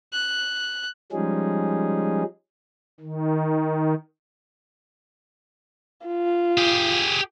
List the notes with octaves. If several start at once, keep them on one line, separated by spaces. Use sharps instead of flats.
F#6
F3 G3 G#3 C#4 D#4 G#4
D#3
F4
G4 G#4